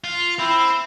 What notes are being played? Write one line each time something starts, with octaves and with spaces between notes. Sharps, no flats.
F4
C4 E4